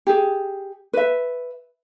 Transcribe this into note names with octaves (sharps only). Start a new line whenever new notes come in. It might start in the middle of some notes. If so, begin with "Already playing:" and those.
G4 G#4
B4 E5